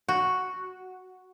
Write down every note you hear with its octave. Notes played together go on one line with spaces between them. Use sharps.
F#4